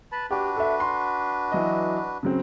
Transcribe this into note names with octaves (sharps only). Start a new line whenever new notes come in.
B4 A5 B5
D4 F#4 G4 B4
A4 E5
C6
E3 F#3 D#5
C#3 F#3 C4